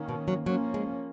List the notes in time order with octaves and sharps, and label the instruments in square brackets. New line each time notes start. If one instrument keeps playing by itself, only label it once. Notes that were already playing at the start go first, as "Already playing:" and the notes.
Already playing: [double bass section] D#3 A#3 C#4
[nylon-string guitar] B2
F#3
[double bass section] F3 A#3 C#4 [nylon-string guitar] F#3
[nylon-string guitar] G#3